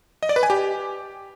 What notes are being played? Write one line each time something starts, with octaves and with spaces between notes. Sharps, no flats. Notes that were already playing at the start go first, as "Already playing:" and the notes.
D#5
D5
B4
G#5
G4